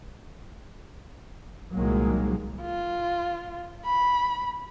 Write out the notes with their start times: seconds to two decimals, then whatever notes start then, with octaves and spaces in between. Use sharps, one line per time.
1.73 C2 A#2 D#3 F#3 G#3 A#3
2.62 F4
3.85 B5